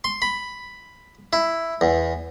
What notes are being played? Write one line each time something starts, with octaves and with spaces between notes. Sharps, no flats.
C6
B5
E4
E2